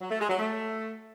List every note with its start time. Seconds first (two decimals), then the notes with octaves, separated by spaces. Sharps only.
0.01 F#3
0.10 A3
0.20 G#3
0.29 F#3
0.39 A3